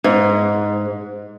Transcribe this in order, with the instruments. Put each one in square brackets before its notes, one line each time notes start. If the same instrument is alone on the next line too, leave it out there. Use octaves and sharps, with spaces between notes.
[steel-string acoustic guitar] G#2